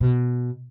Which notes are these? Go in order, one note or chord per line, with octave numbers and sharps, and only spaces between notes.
B2